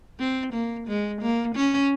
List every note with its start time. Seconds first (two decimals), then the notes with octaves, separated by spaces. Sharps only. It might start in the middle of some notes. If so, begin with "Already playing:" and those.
0.19 C4
0.53 A#3
0.87 G#3
1.21 A#3
1.55 C#4